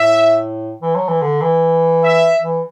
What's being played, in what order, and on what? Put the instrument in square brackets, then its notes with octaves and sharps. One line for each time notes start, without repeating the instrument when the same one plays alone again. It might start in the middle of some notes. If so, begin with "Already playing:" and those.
Already playing: [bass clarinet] A2 [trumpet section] E5
[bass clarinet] E3
F#3
E3
D3
E3
[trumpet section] E5
[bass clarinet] E3